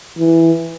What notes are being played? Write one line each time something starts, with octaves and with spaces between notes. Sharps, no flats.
E3